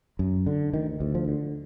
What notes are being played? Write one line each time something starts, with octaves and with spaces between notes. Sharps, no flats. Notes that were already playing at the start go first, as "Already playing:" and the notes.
F#2
D3
D2 D#3
D2
F3
D3